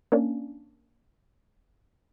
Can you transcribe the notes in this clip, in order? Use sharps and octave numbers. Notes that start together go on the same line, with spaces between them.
A#3 C#4 D4